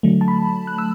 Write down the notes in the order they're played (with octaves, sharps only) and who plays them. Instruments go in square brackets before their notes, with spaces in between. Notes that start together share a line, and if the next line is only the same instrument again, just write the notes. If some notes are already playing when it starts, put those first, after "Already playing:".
[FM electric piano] D3 F#3 A3
A5
B5
F#6
E6